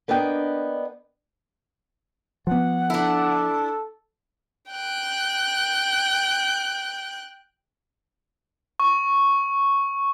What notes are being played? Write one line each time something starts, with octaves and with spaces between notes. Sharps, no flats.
A#3 B3 D4 D#5 G5
F3 B3 F#5
D4 E4 A4
G5 F#6
C#6